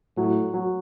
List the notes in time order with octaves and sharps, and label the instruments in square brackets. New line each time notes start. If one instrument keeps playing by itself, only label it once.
[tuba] A2 [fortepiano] F#3
[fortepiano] F#3